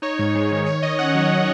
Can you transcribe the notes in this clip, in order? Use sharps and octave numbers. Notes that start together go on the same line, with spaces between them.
D#4 C#5
G#2
G#3
D#3
D#3 C#5
D#3 D#5
C#4 F#5
F#3